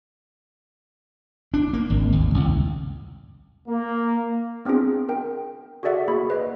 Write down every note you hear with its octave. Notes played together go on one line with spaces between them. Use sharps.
D4
A#3
G#1
D#2
C2
A#3
B3 C4 D4 F4 G#4
A#4 G5
F#4 G#4 A4 D5 E5 F#5
A#3 F#4 G#4 D5 B5
B4 D#5